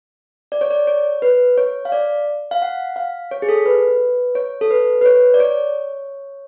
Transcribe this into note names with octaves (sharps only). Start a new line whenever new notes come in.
D5
C#5
D5
C#5
B4
C#5
F5
D5
F5
F#5
F5
C#5
G#4
A4
B4
C#5
A4
B4
B4
C#5
D5
C#5